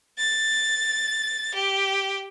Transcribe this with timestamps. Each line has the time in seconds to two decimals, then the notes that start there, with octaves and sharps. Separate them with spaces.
0.18 A6
1.54 G4